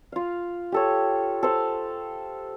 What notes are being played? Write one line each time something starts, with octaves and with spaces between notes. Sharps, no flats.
F4 F5
G4 A4 C#5
A4 C5 F5